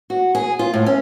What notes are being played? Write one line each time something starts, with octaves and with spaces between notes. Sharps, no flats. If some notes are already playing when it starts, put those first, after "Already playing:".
F#4
G#4
F4
A2
C#4